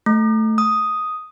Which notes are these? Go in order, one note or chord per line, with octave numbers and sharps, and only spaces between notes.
A3
D#6